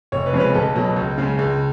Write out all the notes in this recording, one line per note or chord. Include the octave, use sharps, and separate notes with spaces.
F1 C#5
B4
F2 C#3 F3 G#3 C#5
B4
B1 A4
B2 F#3
C#2
C#3 G#3
C#2